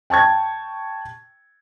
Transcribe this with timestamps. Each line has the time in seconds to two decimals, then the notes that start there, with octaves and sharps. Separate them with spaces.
0.10 G5 A5 C#6 G#6